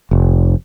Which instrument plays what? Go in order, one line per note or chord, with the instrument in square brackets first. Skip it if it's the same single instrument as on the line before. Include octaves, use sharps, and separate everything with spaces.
[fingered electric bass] F1